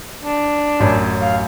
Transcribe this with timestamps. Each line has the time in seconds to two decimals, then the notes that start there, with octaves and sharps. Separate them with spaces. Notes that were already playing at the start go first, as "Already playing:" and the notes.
0.23 D4
0.80 A1 F#2
1.22 F5